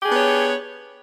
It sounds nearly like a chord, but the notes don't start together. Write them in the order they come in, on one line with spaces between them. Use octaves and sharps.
G4 G#4 D4 B3 C#5